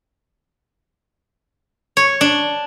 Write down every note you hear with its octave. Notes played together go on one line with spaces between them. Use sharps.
C#5
D4